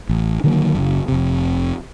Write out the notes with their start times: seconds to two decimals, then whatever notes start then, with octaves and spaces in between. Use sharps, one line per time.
0.09 A1
0.44 D3 D#3 F#3 A#3
0.75 F#1 C#3
1.08 F1 C3